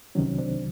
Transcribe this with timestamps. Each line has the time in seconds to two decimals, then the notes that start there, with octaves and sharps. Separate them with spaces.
0.15 C2 C3 D#3 F#3 C#4
0.38 C4 D4